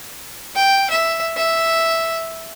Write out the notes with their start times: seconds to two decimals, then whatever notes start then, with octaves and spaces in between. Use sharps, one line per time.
0.55 G5
0.90 E5
1.36 E5